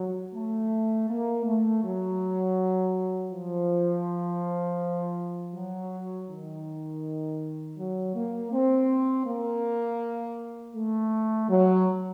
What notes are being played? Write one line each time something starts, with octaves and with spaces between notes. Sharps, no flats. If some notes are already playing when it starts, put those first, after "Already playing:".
Already playing: F#3
A3
A#3
A3
F#3
F3
F#3
D#3
F#3
A#3
C4
A#3
A3
F#3